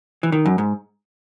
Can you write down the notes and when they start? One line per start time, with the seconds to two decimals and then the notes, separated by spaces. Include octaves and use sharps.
0.23 E3
0.32 D#3
0.46 F#2
0.58 G#2